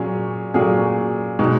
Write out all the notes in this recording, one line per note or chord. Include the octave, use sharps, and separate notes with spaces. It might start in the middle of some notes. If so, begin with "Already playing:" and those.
Already playing: A#2 F#3 C#4 G#4
A#2 F#3 C#4 G#4
B2 G#3 D#4